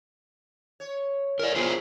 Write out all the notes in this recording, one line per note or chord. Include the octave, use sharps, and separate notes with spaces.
C#5
E4 A#4 D5
A#3 E4 F4 G4 G#4 C5